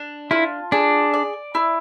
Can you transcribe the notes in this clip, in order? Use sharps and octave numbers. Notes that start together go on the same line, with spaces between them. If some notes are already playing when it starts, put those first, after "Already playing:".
Already playing: D4
E4 F4
D4 G#4
D5
E4